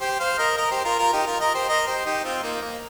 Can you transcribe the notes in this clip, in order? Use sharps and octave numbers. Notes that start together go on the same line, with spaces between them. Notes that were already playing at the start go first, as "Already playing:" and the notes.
G4 C5
C5 F5
A#4 D#5
A#4 D#5
G4 C5
F4 A#4
F4 A#4
D#4 G4
F4 A#4
A#4 D#5
G4 C5
A#4 D#5
G4 C5
D#4 G4
C4 F4
A#3 D#4
A#3